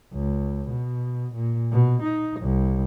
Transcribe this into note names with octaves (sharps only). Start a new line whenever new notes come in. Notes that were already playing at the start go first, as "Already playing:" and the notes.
C#2
B2
A#2
B2
D#4
C2